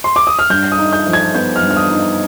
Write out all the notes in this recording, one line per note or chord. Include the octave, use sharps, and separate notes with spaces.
C6
D6
D#6
F6
G2 G6
D#6
D#4
G6
F3
G#6
B3 G6
F6
G2
F6
D#6
D#4